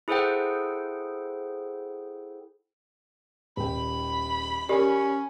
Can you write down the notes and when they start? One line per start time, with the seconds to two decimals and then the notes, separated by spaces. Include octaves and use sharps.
0.08 E4 G#4 A4 C5 F#5 G5
3.57 D#1 G5 B5
4.69 C#4 G4 A#4 D5